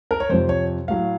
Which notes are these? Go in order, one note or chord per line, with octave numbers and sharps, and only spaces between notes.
A#4
C#5
F2 C3 F3 C5
C#5
A2 F#3 F5